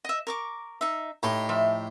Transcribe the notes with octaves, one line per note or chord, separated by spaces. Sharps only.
D#5 E5
A#4 C#6 D6
D#4 E5
A2 D#4 G4 C6
F3 E5